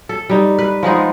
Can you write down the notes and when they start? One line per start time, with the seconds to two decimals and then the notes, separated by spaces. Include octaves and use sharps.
0.09 A4
0.29 G3 D#4
0.59 B4
0.83 F3 G#3 B3 D#4